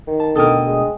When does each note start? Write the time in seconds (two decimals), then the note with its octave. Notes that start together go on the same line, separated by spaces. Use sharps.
0.08 D#3
0.20 A5
0.35 D2 B2 D3 A4 A#4 D#5 G5 D#6
0.67 G#3